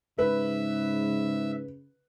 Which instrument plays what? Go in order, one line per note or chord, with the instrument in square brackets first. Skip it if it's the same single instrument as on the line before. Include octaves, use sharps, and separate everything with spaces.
[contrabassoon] G#2 [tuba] C#3 [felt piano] B4 [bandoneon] E5